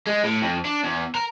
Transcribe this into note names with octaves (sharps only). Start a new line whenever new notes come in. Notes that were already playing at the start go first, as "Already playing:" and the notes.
G#3
A2
F2
D4
E2
A#4